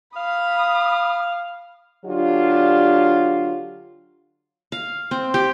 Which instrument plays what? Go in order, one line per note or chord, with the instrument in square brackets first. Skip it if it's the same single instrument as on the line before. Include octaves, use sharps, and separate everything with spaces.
[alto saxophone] F5 [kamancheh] B5 D#6
[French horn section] D3 F#3 D4 F4 G4
[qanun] F5
C4
G4